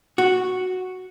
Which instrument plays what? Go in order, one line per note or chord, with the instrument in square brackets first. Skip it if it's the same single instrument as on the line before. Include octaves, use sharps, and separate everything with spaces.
[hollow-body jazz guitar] F#4